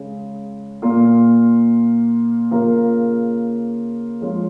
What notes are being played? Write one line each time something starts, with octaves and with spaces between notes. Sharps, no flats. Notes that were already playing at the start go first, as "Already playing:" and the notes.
Already playing: C#3 G#3
A#2 A#3 F4
C#3 A#3 F4 A#4
F3 G#3 C#4 F4